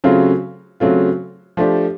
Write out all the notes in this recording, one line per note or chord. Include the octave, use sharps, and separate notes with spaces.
C#3 F#3 A3 C4 F4
C#3 F#3 A3 C4 F4
F3 A3 D4 G4